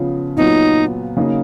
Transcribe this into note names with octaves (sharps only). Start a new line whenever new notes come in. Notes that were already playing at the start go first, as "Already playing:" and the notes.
Already playing: C#3 F3 B3
A#2 F#3 B3 D#4 F4
C#3 F#3 A#3 D#4